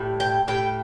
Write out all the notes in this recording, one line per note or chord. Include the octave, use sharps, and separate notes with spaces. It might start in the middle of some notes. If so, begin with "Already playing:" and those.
Already playing: A2 G3
G5
A2 G3 G5